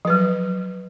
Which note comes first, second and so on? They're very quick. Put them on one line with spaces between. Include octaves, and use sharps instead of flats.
F3 B4 F#3